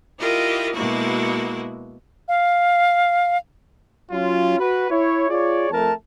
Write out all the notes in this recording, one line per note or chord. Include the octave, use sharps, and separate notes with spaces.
E4 F4 G4 A#4 D#5
B2 G#3 A#3 E4 F#4
F5
F#3 C#4 F4
F#4 B4
E4 C#5
F4 G#4 C#5 D5
F2 A3 A#4 A5